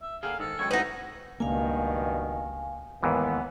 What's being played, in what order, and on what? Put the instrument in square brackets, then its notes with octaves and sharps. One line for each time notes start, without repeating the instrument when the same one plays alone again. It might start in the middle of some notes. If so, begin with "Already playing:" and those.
[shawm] E5
[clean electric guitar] D3 A#3 [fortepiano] G#4 G5 [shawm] F5
[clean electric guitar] G#2 [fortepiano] D#3 [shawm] A4
[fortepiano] F#2 G#3 G5 [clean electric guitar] C#5
[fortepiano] A2 C4 [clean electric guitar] D3 [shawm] D#4 [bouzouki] F#4 B4
[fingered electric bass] C#2 A#3 [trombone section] G2 B2 D#3 [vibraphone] F5 G#5
[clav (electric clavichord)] D#2 G#2 E3 [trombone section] B3